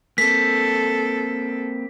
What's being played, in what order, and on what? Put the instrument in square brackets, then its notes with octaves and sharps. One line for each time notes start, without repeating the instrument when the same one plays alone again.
[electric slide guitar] A#3 C4 [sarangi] A4 [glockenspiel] B6